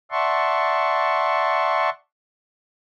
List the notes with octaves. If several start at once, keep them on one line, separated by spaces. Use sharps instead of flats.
D5 E5 F#5 A5 C6 C#6